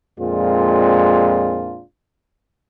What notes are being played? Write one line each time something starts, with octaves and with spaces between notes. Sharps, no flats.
F2 A#2 G#3 C4 D4 F4